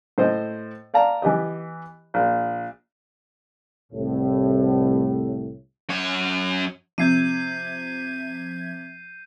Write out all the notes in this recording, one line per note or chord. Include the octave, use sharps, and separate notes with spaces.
A2 C5 D#5
D5 F5 A5 A#5
E3 B3 G4 D#5
A#1
C2 A2
F#2 C#5
C3 F3 E5 G6 G#6 C7 D#7